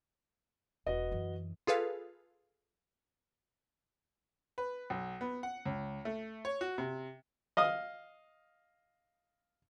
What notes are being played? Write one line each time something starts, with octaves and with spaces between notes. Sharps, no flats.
E1 F#4 B4 D#5
F#2 E3
F4 G#4 A4 B4 F5
B4
B1
B3
F#5
C#2
A3
C#5
F#4
C3
D#5 F5 D#6